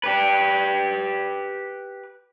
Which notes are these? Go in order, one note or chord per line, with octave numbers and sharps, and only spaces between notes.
G4 B4